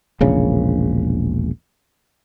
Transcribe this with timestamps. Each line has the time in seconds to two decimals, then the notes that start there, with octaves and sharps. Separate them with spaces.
0.21 E1 A#1 C#3